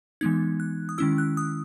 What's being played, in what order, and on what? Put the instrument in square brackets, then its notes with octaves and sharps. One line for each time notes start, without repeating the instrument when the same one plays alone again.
[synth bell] E3 G#3 B3 D#4 G#6
F#6
D#6
D#3 G#3 C#4 E4 E6
F#6
D#6